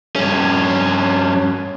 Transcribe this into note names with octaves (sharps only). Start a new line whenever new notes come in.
G2 C#4